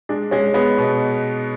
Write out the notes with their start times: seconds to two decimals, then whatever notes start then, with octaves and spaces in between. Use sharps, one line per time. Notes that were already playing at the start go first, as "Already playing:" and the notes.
0.09 G#3 D4
0.31 G#3 C#4
0.54 G#3 B3
0.78 B2